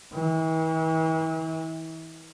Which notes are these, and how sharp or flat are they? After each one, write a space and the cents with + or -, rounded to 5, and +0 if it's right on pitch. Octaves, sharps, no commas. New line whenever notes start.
E3 -40